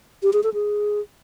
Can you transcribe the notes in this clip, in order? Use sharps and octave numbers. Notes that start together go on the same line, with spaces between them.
G4
G#4
A4
G#4